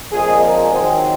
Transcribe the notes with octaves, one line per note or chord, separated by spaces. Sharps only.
A#2 F3 G#3 C4 G#4
A#4
G#2 D#3 F#3 C4 G#4